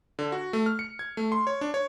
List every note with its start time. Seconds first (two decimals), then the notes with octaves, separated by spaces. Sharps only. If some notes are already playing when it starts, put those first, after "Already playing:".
0.19 D3
0.32 F#4
0.53 A3
0.66 F6
0.79 C#7
0.99 G#6
1.17 A3
1.32 C6
1.47 C#5
1.61 D4
1.74 C#5